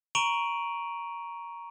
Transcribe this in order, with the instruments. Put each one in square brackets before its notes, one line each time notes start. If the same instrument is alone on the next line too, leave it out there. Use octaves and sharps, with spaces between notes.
[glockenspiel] A#5 C#6 D7 D#7 F7 F#7